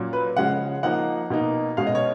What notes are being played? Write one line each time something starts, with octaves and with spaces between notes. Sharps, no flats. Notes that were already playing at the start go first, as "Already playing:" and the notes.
Already playing: A#2 F#3 C#4
B4
C#3 F3 G#3 C#4 F#5
F3 A#3 D#4 F#5
B2 A#3 D#4
B2 G#3 C#4 F5
D#5
C#5